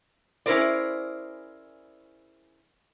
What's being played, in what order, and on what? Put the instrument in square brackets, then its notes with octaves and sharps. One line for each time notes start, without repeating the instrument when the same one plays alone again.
[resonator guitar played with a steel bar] C#4 E4 G#4 A#4 C5 D5